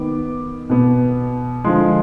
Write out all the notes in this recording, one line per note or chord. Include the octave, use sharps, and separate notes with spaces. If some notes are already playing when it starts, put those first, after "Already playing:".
Already playing: D#3 B3 D6
B2 B3
D3 F3 G#3 C6